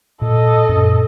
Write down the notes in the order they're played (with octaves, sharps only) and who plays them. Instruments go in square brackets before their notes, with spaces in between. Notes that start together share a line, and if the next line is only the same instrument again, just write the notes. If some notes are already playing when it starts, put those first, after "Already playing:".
[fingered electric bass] A#2 [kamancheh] A4 D#5
[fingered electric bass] F#2 A#2 C#4